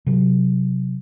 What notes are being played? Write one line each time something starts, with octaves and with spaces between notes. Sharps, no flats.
C3 F#3